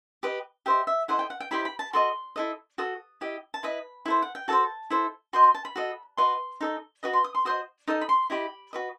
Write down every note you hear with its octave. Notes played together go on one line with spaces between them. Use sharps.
G4 B4 D#5
G4 C5 D#5 E5
E5
E4 A4 C5 D#5 F#5
G5
F#5
G5
E4 G4 C5 D#5 B5
B5
A5
F#4 A4 D#5 C6
E4 A4 D#5
F#4 A4 D#6
E4 G4 D#5
A5
E4 B4 D#5 B5
E4 A4 C5
F#5
G5
F#4 A4 C5 A5
E4 A4 C5
F#4 C5 D#5 C6
C6
A5
B5
F#4 A4 D#5
F#4 B4 D#5 C6
D#4 A4 D#5
F#4 B4 D#5 D#6
C6
D#6
C6
F#4 C5 D#5 D#6
D#4 A4 D#5 D#6
B5
C6
E4 G4 D#5 B5
F#4 B4 D#5